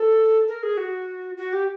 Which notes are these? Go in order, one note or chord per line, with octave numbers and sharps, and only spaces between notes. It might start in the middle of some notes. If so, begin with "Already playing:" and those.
Already playing: A4
A#4
G#4
F#4
F#4
G4